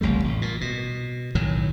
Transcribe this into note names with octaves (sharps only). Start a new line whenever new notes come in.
F#1 C2 G3 A3
A1
A#2
B2
B1 A2 D#3 F#3